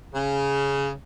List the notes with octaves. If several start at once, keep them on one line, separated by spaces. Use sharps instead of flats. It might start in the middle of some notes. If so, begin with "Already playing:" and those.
C#3